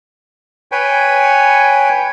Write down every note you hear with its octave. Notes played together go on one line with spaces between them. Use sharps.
B4 C#5 G5 G#5